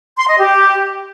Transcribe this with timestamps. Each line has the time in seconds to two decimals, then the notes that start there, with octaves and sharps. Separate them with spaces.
0.17 C6
0.27 D#5
0.38 G4